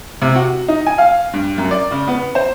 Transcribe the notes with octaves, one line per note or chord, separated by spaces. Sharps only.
C3
F#4
D#4
G#5
F5
G2
F#2
D5
C#3
B3
C5